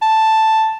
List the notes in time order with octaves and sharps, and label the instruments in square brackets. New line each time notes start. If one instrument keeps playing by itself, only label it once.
[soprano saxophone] A5